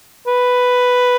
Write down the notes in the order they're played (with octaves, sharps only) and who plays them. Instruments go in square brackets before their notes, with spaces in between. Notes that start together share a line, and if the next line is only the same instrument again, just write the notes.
[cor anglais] B4